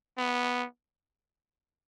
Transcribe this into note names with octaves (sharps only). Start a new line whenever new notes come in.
B3